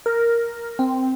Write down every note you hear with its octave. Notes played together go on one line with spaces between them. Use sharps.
A#4
C4